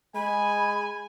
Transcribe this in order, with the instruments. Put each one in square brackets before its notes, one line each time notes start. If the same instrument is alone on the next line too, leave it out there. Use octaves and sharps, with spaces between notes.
[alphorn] G#3 [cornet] G#5 [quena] B5